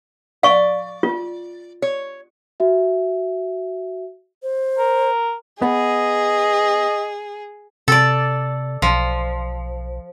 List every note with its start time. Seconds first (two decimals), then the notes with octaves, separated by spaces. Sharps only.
0.43 D5 F5 C#6
1.03 F4
1.82 C#5
2.60 F#4 E5
4.43 C5
4.78 A#4
5.62 B3 G#4 D#5
7.88 C3 A4 D5
8.82 B1 F3